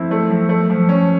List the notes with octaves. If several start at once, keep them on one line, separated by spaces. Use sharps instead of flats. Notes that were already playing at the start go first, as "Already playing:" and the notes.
Already playing: F3 A3 C4 E4
A3
F3
A3
F3
C#4